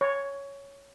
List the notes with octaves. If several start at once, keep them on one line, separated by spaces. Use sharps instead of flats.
C#5